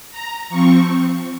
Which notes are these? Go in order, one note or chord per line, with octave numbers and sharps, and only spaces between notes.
A#5
F3 C4 C#6